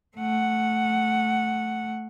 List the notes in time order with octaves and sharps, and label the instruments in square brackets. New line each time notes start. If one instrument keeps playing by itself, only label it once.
[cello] A3 F#5